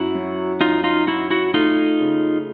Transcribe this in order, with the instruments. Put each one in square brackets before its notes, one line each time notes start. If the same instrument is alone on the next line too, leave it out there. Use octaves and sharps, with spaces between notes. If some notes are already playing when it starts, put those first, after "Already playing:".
Already playing: [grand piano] F#2 [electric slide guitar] E4 F#4
[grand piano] F#3
[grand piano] F#2 [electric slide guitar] D#4 F4
[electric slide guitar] D#4 F4
[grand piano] F#3 [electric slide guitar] E4 F#4
[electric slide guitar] E4 F#4
[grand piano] A3 [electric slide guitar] D#4 F4
[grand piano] C#3